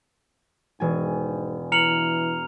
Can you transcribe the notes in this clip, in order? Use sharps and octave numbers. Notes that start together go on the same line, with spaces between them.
E1 G#2 G#5
E3 A#5 F6 C#7 F7 F#7